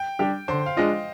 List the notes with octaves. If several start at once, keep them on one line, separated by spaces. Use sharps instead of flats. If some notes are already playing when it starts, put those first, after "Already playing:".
Already playing: G5
G3 D4 G4
D3 C5
F5
G#3 D4 F4 D#5